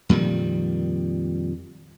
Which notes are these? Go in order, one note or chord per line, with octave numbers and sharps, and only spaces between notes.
F2 A#2 D#3 G3